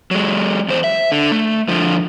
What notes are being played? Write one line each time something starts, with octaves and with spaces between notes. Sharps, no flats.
F#3 G#3
E2 C5
E5
D3
A3
D3 F3